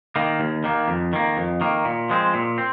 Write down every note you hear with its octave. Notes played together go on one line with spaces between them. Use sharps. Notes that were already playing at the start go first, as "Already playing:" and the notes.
D#3 A#3
D#2
D#3 A#3
F2
D#3 A#3
F2
D#3 A#3
A#2
F3 G#3 C4
A#2
C4